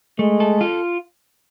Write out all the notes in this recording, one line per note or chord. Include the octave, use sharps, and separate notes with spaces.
G#3 A3
A4
F4